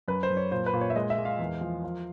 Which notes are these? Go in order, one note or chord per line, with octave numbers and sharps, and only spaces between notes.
F#2 B4
C5
F#2
C#5
A#2 C5
B4
A#2
C#5
E5
G#3 D#5
E5
G#3
F5
E2
F3
F3